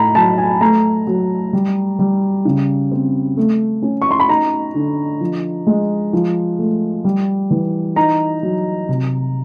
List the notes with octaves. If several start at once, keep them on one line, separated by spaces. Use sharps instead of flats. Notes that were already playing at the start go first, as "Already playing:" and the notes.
Already playing: A2 A#5 B5
F#3 A5
G#5
A3 A#5
F#3
G3
G3
C#3
C4
A3
C#4
C#6
C6
B5
D#4 A#5
D3
F3
G#3
F3
A3
G3
E3
D#4 A#5
F#3
C3